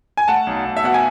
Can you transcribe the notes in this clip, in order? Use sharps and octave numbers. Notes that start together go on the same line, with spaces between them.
G#5
A3 F#5 A5
B1
B1
E5
B2 F#5
G#5